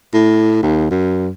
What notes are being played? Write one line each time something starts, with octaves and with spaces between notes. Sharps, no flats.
A2
D#2
F#2